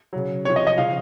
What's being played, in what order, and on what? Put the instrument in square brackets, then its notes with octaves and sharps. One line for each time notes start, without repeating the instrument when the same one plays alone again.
[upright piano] C#3 F#3
C3 C#5
F3
D#5
D#5
C#3 F3 F5